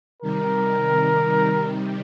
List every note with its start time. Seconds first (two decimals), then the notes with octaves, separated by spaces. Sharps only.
0.22 C3 D#3 G3 A#4